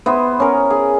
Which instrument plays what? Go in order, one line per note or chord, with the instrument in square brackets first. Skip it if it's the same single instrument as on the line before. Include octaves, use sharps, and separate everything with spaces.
[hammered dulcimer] B3 E4 C5 D#5
C#4 A#4
G#4